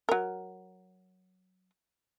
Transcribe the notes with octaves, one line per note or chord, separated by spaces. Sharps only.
F#3 A#4